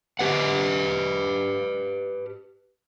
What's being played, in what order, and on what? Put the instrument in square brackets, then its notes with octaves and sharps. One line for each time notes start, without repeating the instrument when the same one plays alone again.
[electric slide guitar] G4 B4 F#5